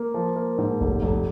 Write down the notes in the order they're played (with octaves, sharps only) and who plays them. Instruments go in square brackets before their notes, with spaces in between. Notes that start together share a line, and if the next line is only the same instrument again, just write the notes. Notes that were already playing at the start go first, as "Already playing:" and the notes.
Already playing: [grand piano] A#3
F3
A#3
G#2
F1
F1